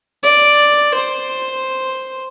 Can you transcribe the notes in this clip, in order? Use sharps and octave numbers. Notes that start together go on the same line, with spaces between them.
D5
C5